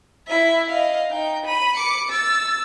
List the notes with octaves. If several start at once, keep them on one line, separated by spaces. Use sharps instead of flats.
E4 E5
D#5 F5
D#4 G5
B5 D#7
D6 C#7
E6 A6